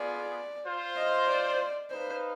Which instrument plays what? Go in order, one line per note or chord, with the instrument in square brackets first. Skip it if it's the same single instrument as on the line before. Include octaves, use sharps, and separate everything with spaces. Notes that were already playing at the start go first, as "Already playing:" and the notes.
Already playing: [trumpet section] B3 F4 G#4 [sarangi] D5
[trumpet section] F4 C5 F5
[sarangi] D#5
D5
[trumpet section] D#4 B4 F5 [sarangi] C5